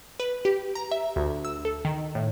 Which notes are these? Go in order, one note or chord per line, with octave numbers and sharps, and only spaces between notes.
B4
G4
A#5
E5
D2
E6
A4
D#3
A2